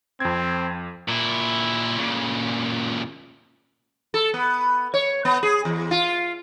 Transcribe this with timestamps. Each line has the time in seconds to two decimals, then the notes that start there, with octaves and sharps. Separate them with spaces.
0.20 F2 C4 G#6
1.08 A#2 E4
1.98 A#2 C#3
4.14 A4
4.34 B3
4.94 C#5
5.25 B3
5.43 G#4
5.65 E2
5.91 F4